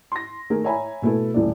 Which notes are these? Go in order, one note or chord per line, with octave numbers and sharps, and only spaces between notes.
C6 A#6
D#3 A3 G#4 A#4
C#5 E5 G#5 A#5 B5
B2 A3 B3 E4 A4
D#1 E3 A3 D5